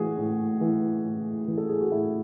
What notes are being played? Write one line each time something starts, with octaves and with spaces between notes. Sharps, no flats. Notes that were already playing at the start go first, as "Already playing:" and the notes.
Already playing: A2 E3 F#4 G#4
A2
E3
A2
E3
A4
G#4
F#4
A2 E4